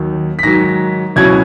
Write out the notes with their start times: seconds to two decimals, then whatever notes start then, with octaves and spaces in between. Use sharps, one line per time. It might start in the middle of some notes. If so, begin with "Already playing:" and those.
Already playing: D#2 D#3 F#3
0.39 B6
0.43 G#2 D#3 F#3 A#6
1.16 C#2 B2 F#3 C#4 E4 G#6